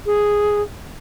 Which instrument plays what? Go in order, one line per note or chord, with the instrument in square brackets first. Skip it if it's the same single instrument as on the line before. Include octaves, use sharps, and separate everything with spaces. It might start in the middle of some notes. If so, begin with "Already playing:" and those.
[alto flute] G#4